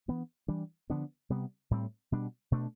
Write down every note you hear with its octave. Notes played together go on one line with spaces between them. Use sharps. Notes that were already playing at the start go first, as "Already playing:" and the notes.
E3 B3 D4
E3 G3 D4
D3 F3 B3 D4
C3 G3 B3
A2 G3 C4
B2 G3 D4
B2 A3 D4